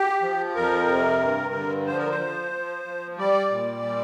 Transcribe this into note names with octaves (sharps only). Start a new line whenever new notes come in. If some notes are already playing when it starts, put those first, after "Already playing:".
Already playing: G4
F3
F2 A#4
C3
G2
D3
F3 C5
A#4
C5
F3
F3
F3
G3 D5
A#2
G3